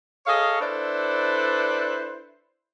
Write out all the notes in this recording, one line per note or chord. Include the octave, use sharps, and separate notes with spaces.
G#4 A4 C#5 D#5 F5
D4 E4 A4 B4 C5 D5